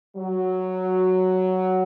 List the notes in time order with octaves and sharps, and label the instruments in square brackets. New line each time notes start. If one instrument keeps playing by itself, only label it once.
[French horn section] F#3